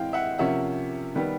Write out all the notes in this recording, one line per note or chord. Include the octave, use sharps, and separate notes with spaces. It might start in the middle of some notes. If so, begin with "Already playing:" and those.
Already playing: A2 E3 G#3 C4 F5 G5
E5 F#5
C3 F3 A#3 C#4 E5 F#5
D#3 G3 B3